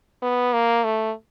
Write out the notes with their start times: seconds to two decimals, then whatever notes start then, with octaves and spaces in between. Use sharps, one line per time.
0.22 B3
0.53 A#3
0.84 A3